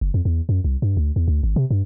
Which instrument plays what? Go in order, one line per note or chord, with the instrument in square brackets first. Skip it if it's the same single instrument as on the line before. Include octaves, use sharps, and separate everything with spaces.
[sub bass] F#1
F2
E2
F#2
C2
G2
D2
E2
D2
G#1
C3
G2